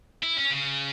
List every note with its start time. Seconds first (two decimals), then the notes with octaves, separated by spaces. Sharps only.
0.23 E4
0.37 C#4
0.50 C#3